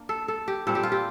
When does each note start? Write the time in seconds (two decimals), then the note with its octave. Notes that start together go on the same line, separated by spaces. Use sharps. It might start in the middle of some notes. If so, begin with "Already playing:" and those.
Already playing: A#3 D4
0.09 A4
0.28 A4
0.48 G4
0.67 A#2 G3 C4 A4
0.75 G4
0.83 F4
0.92 G4